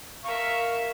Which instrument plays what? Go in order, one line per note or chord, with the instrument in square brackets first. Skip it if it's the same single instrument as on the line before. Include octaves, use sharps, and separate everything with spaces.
[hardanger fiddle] A#4 E5 [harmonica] F5 C#6